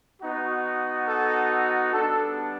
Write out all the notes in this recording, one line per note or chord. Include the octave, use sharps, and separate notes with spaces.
B3 D#4 F#4
A4
G3 B3 D4 A4